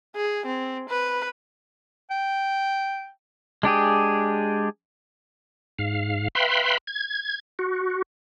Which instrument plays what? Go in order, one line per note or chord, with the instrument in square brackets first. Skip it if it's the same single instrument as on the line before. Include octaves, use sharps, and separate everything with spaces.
[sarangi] G#4
C4
B4
[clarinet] G5
[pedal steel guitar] G#3 D4 G4 G#4
[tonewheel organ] G#2 F5
B4 E5 F5 G5 B5 C6
G#6
F#4